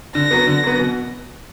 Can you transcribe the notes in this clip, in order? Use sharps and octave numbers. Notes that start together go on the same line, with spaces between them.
D3 A#6
F#3 B3
D3
F#3 B3
B2